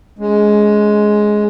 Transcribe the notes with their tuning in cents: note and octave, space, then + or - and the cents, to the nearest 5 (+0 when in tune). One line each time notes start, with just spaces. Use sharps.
G#3 +10 C#4 +20